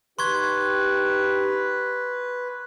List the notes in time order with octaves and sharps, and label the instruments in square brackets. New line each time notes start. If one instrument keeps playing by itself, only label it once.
[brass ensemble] D#4 G4 [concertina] B4 [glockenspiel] C6 C#6 G#6